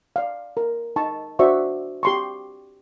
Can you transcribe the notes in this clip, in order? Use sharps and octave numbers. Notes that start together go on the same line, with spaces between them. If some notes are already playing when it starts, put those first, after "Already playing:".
D5 F5
A#4
D#4 A5 C#6
D4 F#4 C5 D5 E5 C#6
G4 C6 C#6